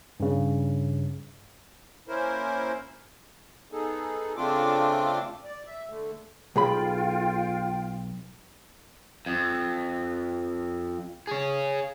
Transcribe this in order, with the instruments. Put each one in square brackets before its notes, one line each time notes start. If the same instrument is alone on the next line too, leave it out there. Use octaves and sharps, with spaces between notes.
[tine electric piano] G2 C#3
[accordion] A#3 C#4 E4 A#4 C5
B3 D#4 G#4 A4
C#3 A3 C4 D4 F4 D6
D5
E5
D3 A3
[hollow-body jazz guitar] B1 G#4 B5 [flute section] F4 G5
[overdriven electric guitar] F2
G#4 C#5